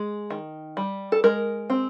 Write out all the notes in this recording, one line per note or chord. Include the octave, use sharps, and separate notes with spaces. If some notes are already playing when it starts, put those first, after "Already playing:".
Already playing: G#3
D#3
G3
A4
G#3 A#4
C4